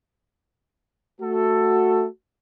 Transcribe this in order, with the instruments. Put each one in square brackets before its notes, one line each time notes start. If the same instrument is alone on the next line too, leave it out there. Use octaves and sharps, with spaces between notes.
[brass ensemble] A3 F#4 A4